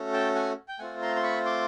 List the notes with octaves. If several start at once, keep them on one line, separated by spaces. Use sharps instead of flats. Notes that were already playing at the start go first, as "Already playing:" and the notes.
Already playing: A3 C#4 F#4 A4
G5 A5
F#5 G#5
G5
A3 C4 F4 F#5 G#5
A#5 C6
C6
B5 C#6
C6 D6